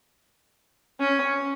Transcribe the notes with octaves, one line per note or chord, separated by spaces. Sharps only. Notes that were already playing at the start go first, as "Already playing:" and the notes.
C#4